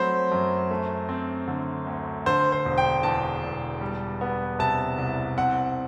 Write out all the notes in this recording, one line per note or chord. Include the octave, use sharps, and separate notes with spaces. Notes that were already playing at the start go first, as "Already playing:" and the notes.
Already playing: F#3 A3 C4 C5 B5
F#2
A3
C4
D3
D2
D3 C5
C5
E1
G5
E2 A5
E1
G3
B3
C3 A5
C2
C4 F#5